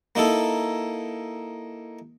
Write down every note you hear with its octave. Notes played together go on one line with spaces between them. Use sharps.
A#3 D#4 E4 A4